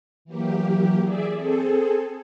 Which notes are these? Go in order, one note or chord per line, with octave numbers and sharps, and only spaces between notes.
E3 F#3 A#3 G4
G#4 D5 E5
C4 G#4 A4